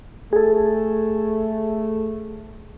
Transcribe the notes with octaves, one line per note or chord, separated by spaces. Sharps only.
A3 G#4 A4